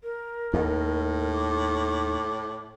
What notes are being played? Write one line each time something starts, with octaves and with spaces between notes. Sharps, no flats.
A#4
D#2 A2
D6